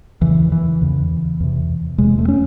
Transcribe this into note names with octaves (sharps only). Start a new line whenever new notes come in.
E2 C#3 E3
E3
E2 C#3
E2 C3
E2 C3 G#3
A3
C#4